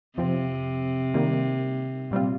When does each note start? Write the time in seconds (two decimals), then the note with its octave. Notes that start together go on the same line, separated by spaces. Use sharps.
0.18 F2 C3 F3 C4
1.14 D#3 G3 A#3
2.11 A#2 G3 C4 F4